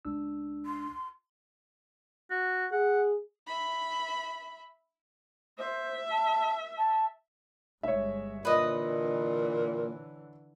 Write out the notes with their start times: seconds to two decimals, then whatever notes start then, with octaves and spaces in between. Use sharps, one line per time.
0.05 C#2 D4 E6
0.66 C6
2.30 F#4
2.72 G#4 F#5
3.47 E5 B5
5.58 C5 E5
6.11 A5
6.77 A5
7.83 G1 G#3 C#5 E5
8.45 A#2 D3 E3 B4 D#5